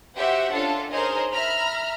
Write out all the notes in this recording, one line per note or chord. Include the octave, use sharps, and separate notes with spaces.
F#4 G4 C5 E5 F#5 G5
C#4 D4 F4 A4 A5
D#4 G#4 A#4 C5 C#5 D#5
E5 A#5 B5 F6